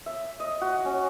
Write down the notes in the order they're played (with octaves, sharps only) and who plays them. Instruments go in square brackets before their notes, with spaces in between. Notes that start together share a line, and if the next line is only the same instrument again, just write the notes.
[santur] E5
D#5
F#4
C#4